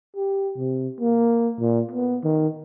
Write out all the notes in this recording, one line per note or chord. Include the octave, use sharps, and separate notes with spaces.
G4
C3
A#3
A#2
B3
D#3